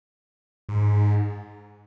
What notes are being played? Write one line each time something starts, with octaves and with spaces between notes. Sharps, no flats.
G#2